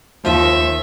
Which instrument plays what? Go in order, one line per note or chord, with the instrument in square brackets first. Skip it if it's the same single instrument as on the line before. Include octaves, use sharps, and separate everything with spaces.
[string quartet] D#2 [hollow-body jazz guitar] F3 F4 [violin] E5